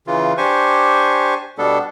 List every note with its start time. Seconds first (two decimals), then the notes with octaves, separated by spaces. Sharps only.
0.07 C#3 E3 F4
0.37 D4 G4 C5 G#5 C#6
1.58 B2 G3 B3 D4 A4